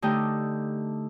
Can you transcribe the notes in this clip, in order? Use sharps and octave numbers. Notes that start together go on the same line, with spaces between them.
D3 A3 D#4 G4 D#5 G5